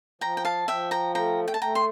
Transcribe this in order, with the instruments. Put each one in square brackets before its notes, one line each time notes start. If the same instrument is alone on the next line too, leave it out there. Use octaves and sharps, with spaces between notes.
[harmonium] F3 [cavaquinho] G5 A#5
[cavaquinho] G5
F5 A5
[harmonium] F3 [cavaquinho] E5 G5
[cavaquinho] G5 A#5
[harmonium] A3 [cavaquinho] G5 A#5
[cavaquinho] G5
A5
[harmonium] A3 [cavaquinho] G5 A#5
[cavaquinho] C6